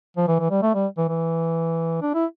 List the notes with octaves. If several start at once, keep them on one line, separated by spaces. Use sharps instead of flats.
F3
E3
E3
G3
A3
G3
E3
E3
D4
E4